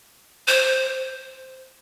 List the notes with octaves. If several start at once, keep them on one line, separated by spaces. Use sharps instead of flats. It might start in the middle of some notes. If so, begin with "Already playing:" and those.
C5